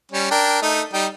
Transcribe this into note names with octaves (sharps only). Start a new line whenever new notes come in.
G3 C#4
D4 A#4 G5
A3 D#4
G3 D#4 G5